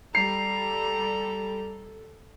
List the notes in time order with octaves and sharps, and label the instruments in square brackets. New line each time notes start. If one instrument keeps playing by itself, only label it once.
[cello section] G3 [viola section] A4 [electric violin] A#5 [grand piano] C7